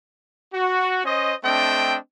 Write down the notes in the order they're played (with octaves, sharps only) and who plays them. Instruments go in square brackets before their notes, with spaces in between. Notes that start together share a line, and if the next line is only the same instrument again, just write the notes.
[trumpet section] F#4
C#4 C5 D#5
A3 C4 D4 D#5 G5